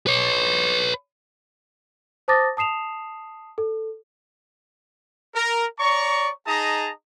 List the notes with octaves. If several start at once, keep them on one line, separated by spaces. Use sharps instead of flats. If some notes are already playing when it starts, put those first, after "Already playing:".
B4 C#5
C5 A5 D6 D#6 A6 A#6
A5 D#6 C7 E7 F7
A4
A#4
C#5 D5 A#5 C#6
D#4 G#4 D#5 A5 A#5 D#6